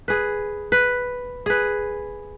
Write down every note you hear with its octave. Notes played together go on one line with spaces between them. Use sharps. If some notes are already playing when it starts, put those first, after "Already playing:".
G#4 B4
B4
G#4 B4